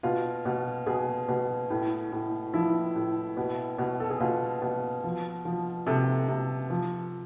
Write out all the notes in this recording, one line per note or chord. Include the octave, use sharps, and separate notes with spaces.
B2 F4
B2
B2 G#4
B2
A2
A2
F3 E4
A2
B2
B2
A4
G#4
B2 F4
B2
F3
F3
C3 A4
C3
F3